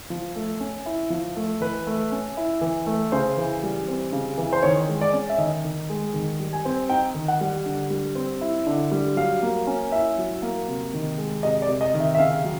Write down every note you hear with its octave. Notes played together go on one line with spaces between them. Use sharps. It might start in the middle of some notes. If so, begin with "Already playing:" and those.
F3
A3
C#4
E4
F3
A3
E3 B4
A3
C#4
E4
E3
A3
C#3 C5
E3
G3
C4
C#3
E3
C5
D#3 C#5
G#3
D5
C#4
E5
D#3 D#5
D#3
G#3
D#3
G3
G#5
C4
D#4 G5
D#3
F#5
G3
D3
G3
C4
E4
D3
G3
F#3 F5
A#3
C#4
E4 E5
F#3
A#3
C3
D#3
G#3
C3 D#5
D5
C3
D#5
D#3
E5
E5
C#3 F5
F#3